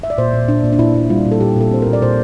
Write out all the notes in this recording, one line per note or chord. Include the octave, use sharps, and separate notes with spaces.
E5
D5
A#2 C5
A#2
A#2 D4
A#2
D4
A#2 E4
A#2
G3 F4
A#2
A4
A#2 G4
A#2 A4
C4 C5
A#2 A#4
D5
A#2 C5